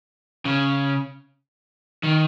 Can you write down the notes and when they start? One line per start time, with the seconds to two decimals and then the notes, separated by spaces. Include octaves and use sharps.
0.45 C#3
2.03 D#3